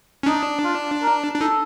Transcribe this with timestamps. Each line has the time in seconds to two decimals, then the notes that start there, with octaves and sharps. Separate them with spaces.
0.23 C#4
0.26 D4 D#4
0.64 F4
1.03 A#4
1.36 D4
1.40 D#4 A4